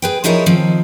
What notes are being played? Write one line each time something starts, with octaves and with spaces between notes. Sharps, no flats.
G#4 B4 G5
F3 D#4 E4 G#4 A#4 C#5
D#3 F3 C4